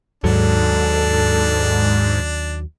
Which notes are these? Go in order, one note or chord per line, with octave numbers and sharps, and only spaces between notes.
D#2 G#2 F#3 D4 A4